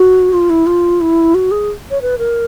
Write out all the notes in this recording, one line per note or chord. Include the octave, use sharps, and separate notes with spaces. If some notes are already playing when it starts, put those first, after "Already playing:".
Already playing: F#4
F4
E4
F4
E4
F#4
G#4
C#5
B4
A#4